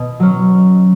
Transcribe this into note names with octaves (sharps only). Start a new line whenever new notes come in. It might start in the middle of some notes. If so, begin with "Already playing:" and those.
Already playing: B2
F#3 C#4